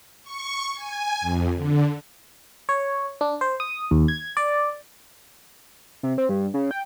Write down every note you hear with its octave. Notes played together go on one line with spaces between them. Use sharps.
C#6
G#5
F2
D3
C#5
D4
C5
D#6
D#2
G#6
D5
C3
C4
G2
C#3
G5